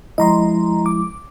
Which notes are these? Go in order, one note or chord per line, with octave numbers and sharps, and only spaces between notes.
F3 G#3 E4 D#5 A#5 C6
D6